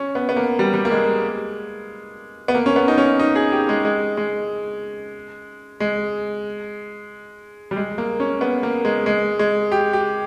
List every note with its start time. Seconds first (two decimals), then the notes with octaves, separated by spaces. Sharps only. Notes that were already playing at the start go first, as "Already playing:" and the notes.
Already playing: C#4
0.15 B3
0.29 B3
0.36 A#3
0.59 G3
0.74 G3
0.85 A#3
0.91 G#3
2.48 B3
2.55 A#3
2.66 C#4
2.76 B3
2.88 D#4
2.98 C#4
3.19 D#4
3.35 G#4
3.52 G4
3.69 G#3
3.85 G#3
4.17 G#3
5.80 G#3
7.71 G3
7.76 G#3
7.98 A#3
8.20 C#4
8.41 B3
8.63 A#3
8.85 G#3
9.06 G#3
9.39 G#3
9.72 G4
9.93 G4